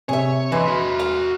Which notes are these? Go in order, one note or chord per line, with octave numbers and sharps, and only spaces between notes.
C3 G#4 C#5 E5
E3 G#3 E4 B4 C6
F#4 E5
F5